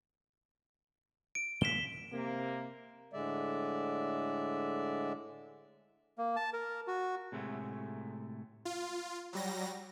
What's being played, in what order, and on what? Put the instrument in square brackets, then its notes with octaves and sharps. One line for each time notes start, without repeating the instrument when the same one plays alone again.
[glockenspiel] D7
[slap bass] E2 A#2 G#3 [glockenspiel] B6 E7 G7
[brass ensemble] C3 A#3
[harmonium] A2 D3 G#3 D5 E5
[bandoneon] A#3
A5
A#4
F#4
[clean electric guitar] A2 C3 G#3 A3
[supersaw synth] F4
F#3 G3 A#6